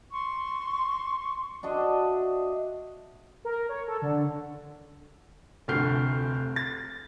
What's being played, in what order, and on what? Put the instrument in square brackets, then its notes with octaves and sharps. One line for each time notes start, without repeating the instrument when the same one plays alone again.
[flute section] C6 C#6
[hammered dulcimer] D4 F#4 D#5 E5
[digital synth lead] A#4
C#5
A4
D3
[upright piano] F1 D2 A3 F6 G6 C7
A6